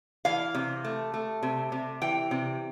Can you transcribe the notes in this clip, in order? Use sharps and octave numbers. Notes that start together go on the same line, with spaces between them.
E3 F5
C3
A3
A3
C3
C3
E3 G5
C3